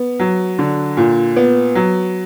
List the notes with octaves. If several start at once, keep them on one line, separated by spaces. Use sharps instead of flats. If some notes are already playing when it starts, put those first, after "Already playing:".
Already playing: B3
F#3
D3
A#2
B3
F#3